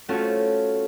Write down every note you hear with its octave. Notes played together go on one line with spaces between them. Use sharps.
A3 C4 C#4 F4 F#4